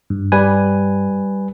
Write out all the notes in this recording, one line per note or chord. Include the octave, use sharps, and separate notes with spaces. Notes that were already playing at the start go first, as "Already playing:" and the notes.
G2
G3 B4 G#5